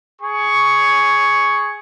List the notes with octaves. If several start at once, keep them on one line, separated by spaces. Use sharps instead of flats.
G#4 C#6